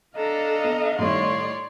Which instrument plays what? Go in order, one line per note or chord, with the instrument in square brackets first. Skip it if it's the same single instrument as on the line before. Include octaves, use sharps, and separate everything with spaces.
[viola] D4 A4 [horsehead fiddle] D#5 F5 [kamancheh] A#5
[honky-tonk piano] B3
[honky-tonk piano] A2 D#3 G3 [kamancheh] C#5 C6 [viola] D5